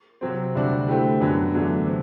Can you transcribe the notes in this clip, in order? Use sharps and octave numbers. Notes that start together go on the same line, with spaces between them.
C3 F#3 C4
D2 C3 G3 D4 F#4
D3 A3 C4 E4 G4
F#2 D3 F#3 B3
E2 D3 F#3 A3 D4
C3